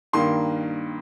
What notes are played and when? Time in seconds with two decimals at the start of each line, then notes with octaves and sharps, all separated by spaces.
0.13 G2 D#3 A#3 C6